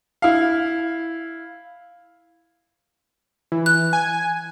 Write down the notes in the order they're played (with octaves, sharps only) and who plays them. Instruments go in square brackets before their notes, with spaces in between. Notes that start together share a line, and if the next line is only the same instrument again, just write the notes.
[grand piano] E4 F5
[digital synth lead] E3
[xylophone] F#6
[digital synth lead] G#5